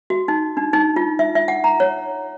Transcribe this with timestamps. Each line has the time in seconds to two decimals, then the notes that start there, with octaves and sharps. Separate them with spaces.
0.10 F#4
0.28 D#4
0.57 D4
0.73 D#4
0.96 F4
1.19 E5
1.35 E5
1.48 F#5
1.64 A#5
1.80 C#5